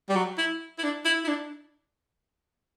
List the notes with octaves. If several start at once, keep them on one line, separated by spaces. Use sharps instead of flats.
G3
F#3
E4
E4
D4
E4
E4
D4